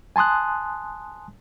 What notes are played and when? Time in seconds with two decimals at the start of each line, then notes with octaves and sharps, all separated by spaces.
0.16 G#5 A5 C6 D#6 F#6